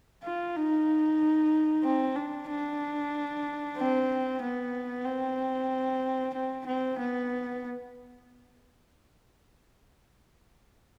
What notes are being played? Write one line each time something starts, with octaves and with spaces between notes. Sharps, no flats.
F4
D#4
C4
D4
D4
C4
B3
C4
C4
C4
B3